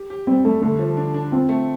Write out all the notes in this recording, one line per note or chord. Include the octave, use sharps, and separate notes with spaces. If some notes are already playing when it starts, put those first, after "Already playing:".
Already playing: G4
G4
G3 C4
G3 A3
D3 A3
F3
D4
D4
C4 F4
A3